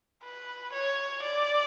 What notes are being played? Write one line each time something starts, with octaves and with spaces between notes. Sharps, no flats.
B4
C#5
D5